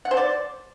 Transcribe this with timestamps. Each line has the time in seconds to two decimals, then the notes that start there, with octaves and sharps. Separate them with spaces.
0.05 F#5
0.11 C5
0.17 D5